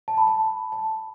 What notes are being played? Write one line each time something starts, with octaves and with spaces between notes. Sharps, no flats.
A5
B5
A5
A5